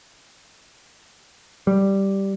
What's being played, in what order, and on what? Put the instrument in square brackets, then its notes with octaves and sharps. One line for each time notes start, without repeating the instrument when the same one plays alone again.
[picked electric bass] G3